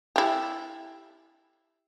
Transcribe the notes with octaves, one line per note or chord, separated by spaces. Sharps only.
E4 G4